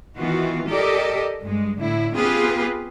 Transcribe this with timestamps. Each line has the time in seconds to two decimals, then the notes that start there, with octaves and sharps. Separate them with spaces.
0.17 D#3 E3 B3 F4 F#4
0.67 G4 A4 A#4 D5 D#5
1.40 G2 G#3
1.78 A2 D3 E4
2.15 B3 C4 F4 G4 G#4 B4